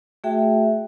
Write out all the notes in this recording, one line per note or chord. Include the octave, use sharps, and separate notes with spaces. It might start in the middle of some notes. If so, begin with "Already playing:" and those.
A3 F#4 G#4 E5 G5